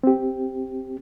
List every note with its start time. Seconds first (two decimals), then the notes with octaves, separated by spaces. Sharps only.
0.03 C4 G4